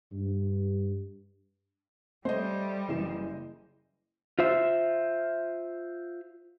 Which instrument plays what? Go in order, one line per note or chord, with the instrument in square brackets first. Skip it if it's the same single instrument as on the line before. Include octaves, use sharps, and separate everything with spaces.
[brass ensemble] G2
[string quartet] G3 [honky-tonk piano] A3 [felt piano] C5 D#5
[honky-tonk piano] F#1 E3 E7
[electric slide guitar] F4 C5 E5